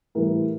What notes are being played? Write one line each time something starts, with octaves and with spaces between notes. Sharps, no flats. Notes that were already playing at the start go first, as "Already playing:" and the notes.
A2 E3 G3 A#4